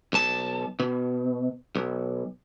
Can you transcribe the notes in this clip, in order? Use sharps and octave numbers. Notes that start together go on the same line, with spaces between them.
B1 A5
B2
B1